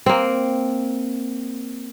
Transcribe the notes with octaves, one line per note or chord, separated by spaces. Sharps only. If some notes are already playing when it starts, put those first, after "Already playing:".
A#3 C4